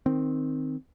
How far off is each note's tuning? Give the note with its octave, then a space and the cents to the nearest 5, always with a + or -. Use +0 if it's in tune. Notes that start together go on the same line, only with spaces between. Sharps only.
D#3 +0 C4 +0